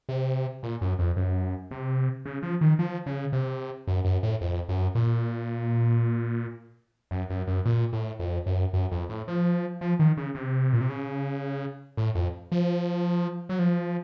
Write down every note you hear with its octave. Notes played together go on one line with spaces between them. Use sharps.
C3
A#2
F#2
F2
F#2
C3
C#3
F3
D#3
F3
C#3
C3
F#2
F#2
A2
F2
F#2
A#2
F#2
F#2
F#2
A#2
A2
F2
F#2
F#2
F2
A2
F3
F3
D#3
C#3
C3
A#2
C3
C#3
A2
F2
F3
F#3
F3